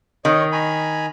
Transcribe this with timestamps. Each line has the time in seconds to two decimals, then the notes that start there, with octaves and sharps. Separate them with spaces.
0.25 D#3 C#5 D#5
0.52 G#5 A#5 B5